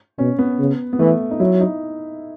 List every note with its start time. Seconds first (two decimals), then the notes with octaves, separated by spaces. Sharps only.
0.18 B2 C#4
0.39 B3
0.59 C#3
0.93 B3
0.99 E3 A3
1.31 D#4
1.40 F#3 E4
1.61 D#4